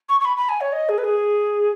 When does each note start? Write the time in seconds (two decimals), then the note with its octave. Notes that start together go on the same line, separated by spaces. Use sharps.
0.09 C#6
0.20 C#6
0.25 B5
0.37 B5
0.49 G#5
0.61 C#5
0.72 D#5
0.89 G#4
0.98 B4
1.04 G#4